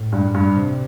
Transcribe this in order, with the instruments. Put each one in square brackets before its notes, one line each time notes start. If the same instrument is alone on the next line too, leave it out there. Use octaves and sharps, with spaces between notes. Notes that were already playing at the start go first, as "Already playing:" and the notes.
Already playing: [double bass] A2
[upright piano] G2
G2
[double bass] C3